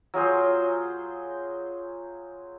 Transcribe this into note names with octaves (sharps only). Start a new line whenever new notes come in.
F#3 F4 G#4 C5